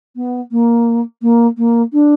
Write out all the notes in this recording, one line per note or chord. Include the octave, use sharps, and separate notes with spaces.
B3
A#3
A#3
A#3
D4